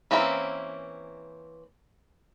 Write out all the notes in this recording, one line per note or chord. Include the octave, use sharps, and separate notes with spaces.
E3 A#3 C4 C#4 E4